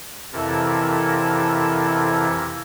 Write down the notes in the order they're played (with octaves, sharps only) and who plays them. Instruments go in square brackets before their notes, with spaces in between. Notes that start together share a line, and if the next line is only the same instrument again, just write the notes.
[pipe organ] F2 C3 E3 E4 A4 A#4